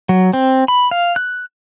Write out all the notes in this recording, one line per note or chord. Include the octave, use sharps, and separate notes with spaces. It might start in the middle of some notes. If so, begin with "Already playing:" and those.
F#3
C4
B5
F5
F#6